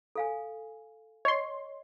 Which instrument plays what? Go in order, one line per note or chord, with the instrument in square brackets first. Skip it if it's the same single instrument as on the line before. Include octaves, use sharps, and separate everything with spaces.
[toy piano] A4 F5 G#5
[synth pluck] C#5 C6 [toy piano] D#5